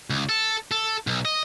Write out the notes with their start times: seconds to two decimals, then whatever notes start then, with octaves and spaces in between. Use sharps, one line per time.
0.10 C#2
0.29 A4
0.71 A4
1.07 B1
1.25 D#5